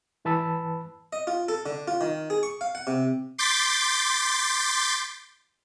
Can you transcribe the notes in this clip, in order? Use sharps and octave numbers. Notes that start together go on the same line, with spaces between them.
G#2 E3 B4 A5 B5 E6
D#5
F4
A4
D3
F4
D#3
G#4
C#6
F5
F#5
C3
C6 D6 G6 A6 B6